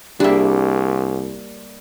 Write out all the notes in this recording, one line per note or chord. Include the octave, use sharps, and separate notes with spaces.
C2 G3 A#3 D4 G#4 E5